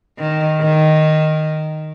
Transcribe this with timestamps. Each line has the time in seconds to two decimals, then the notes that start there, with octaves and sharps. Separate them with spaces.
0.18 D#3
0.60 D#3